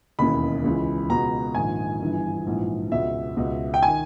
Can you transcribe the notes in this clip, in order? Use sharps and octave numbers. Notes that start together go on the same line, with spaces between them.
E1 D#2 C#3 E3 B5
C#2 C#3 E3
C#2 B2 A#5
A#1 G#2 D#3 G#5
G1 G2 E3
A#1 G#2 E3
C#2 B2 E5
C#2 B2
G5
D#3 G#5